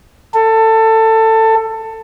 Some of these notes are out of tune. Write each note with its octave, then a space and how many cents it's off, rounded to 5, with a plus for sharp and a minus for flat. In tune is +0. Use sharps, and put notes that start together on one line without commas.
A4 +20